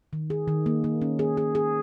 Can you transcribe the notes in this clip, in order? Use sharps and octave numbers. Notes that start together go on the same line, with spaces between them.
D#3
G#4
D#3
A#3
A#3
C#4
G#4
G#4
G#4